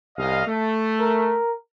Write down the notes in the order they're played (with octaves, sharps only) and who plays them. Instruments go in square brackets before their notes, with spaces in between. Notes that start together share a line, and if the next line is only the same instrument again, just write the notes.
[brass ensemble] C2 D#5 F5
A3
[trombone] A#4